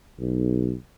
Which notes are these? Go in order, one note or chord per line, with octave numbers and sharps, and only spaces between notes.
B1